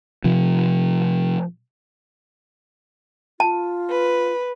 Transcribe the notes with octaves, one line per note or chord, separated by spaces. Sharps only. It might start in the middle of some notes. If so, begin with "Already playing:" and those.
C3 F3
F4 A5
B4